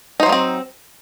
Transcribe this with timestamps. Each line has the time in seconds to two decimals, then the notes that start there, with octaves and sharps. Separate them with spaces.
0.20 D#4
0.23 C5
0.26 F#3
0.29 A#3
0.32 C4